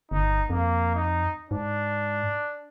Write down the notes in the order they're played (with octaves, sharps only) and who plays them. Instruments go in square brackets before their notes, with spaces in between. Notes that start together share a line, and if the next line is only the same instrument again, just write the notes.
[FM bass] G1 [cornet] D#4
[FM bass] F2 [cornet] A#3
[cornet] D#4
[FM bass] G#2 [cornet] D4